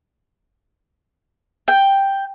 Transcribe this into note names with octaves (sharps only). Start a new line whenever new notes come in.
G5